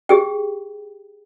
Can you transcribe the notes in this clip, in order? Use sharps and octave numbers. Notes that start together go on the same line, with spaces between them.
G4 G#4 G5